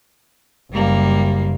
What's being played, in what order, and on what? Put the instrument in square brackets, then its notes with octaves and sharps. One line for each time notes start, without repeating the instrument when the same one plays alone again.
[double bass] F#1 [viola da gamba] G3 A#3